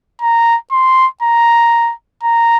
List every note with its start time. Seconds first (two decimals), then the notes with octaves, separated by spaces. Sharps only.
0.22 A#5
0.72 C6
1.22 A#5
2.23 A#5